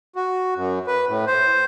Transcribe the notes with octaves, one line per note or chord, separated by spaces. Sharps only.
F#4
F#2
B4
A2
C5